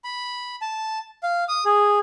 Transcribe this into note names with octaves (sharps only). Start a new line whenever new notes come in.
B5
A5
F5
D#6
G#4